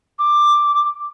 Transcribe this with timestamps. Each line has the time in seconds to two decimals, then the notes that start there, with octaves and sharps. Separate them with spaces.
0.19 D6